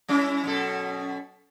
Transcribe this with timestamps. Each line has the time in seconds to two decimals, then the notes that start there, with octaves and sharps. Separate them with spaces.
0.08 G3 C#4 E4
0.44 F#2 B2 A4